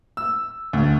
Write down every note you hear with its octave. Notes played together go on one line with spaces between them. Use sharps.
E6
D2